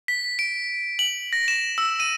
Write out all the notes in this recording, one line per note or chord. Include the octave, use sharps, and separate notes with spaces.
B6
D7
F#7
A#6
E7
E6
D#7